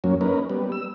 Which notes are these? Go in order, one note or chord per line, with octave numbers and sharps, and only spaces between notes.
F#2 F#3 A#3 C#4
A#3 C#4 D#4 A#4 B4
G3 B3
E6